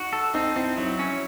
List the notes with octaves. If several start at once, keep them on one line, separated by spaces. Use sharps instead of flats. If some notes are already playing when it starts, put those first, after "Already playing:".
Already playing: D#4 F#4
A4
C4 D#4
C4 E4
F#3 E4
C#4